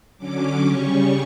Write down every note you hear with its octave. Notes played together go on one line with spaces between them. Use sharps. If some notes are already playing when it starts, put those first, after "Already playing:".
D3 F#3 C#4 D6
C#3 G3 C#4 C#6